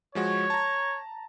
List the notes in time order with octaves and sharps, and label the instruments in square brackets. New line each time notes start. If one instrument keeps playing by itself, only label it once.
[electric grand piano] F3 G#3 F#4 [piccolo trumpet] C#5
[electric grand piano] A5 A#5